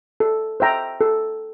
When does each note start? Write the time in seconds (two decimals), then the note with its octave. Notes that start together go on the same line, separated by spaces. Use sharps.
0.20 A4
0.60 C5 E5 G5 A#5
1.01 A4